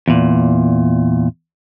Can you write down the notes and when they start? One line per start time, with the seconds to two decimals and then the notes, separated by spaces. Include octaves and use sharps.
0.08 E2 A#2